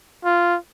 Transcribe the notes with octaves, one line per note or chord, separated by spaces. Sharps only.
F4